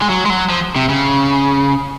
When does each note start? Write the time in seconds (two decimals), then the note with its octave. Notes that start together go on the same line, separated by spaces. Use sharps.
0.02 G#3
0.09 F#3
0.25 G#3
0.30 F#3
0.49 F3
0.76 C3
0.89 C#3